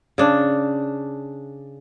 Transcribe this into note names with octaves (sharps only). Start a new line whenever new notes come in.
C#3 D4